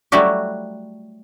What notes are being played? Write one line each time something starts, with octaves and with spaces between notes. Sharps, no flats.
F#3 G3 A3 E4 F#4 G4